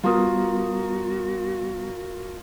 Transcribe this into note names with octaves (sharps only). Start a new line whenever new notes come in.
G3 B3 F4 F#4 A#4 D#6